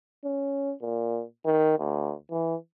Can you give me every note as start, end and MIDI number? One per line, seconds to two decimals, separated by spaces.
0.24 0.74 61
0.82 1.23 46
1.45 1.78 51
1.79 2.13 38
2.31 2.55 52